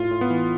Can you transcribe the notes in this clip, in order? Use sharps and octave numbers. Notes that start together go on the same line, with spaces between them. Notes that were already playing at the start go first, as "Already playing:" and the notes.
Already playing: A2 F4
A2
B3
E3